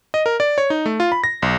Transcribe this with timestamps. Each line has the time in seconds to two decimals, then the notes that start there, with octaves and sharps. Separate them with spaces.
0.14 D#5
0.26 A#4
0.40 D5
0.58 C#5
0.70 D#4
0.86 A3
1.00 F4
1.12 B5
1.24 A#6
1.42 B1